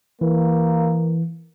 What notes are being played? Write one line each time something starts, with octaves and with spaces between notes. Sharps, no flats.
E3 A#3